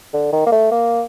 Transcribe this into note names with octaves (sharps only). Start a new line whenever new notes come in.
D3
D#3
A#3
A3
A#3